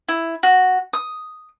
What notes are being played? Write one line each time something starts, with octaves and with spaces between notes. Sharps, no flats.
E4
F#4
D#6